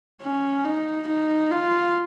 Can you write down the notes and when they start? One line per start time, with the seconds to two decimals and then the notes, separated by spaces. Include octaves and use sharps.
0.22 C#4
0.64 D#4
1.07 D#4
1.51 F4